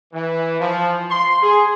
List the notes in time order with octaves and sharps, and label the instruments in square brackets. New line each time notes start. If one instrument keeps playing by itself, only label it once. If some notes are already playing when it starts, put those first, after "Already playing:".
[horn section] E3
F3
C6
G#4